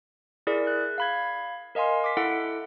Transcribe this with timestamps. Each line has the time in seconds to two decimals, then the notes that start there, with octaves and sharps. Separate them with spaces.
0.47 E4 G#4 A#4 D5
0.67 F#6
0.98 F5 B5 G#6
1.75 A#4 D#5 F5 G#5 C6
2.04 D6 B6
2.17 E4 A4 F#5